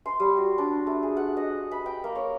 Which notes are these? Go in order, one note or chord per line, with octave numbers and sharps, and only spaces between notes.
C6
G3
F#4
D4
A3
G#4
F#5
D#5
B5
G5
A#3
C#5